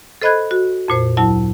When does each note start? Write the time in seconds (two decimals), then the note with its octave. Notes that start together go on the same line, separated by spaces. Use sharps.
0.22 A4 C5 D#5 B5 F#6 G#6
0.51 F#4
0.88 F2 A#2 C5
1.17 D2 F#3 E4 A5